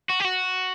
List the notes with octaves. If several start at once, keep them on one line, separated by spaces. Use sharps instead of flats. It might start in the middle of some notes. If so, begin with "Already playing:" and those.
F#4
G4
F#4